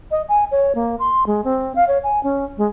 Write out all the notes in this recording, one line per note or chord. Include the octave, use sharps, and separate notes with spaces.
D#5
G#5
C#5
A#3
C6
G#3
C4
F5
C#5
G#5
C#4
G#3